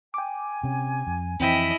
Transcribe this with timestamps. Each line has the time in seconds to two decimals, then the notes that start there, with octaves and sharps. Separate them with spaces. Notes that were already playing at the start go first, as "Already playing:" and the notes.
0.14 G5 G#5 D6
0.64 C3 C#4
1.07 F2
1.40 F2 E3 C4 E4 D#5 G5 B6